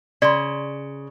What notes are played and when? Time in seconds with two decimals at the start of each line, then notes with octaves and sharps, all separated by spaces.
0.22 C#3 D5 C6